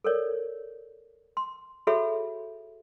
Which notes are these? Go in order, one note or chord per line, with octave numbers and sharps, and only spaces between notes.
A4 A#4 C#5 D5
C6
F#4 G#4 A4 C#5 E5 B5